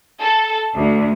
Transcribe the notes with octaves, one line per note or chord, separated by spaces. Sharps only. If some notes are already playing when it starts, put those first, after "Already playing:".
A4
D2